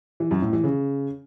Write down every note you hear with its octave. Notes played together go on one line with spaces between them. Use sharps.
E3
F#2
A2
E3
C#3